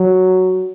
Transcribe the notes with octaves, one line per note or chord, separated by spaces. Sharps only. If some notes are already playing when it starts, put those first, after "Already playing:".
Already playing: F#3